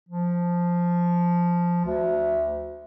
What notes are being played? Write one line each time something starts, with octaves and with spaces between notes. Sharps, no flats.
F3
D2